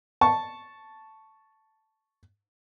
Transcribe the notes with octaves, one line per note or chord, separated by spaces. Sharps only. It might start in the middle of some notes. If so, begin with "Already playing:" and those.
A5 C#6